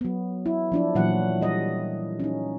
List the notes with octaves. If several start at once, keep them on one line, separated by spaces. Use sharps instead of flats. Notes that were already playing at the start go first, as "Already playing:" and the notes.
F#3 B3
E4
F3 D4 E4
A#2 E3 F#3 F#5
G3 D#5
C#4 D#4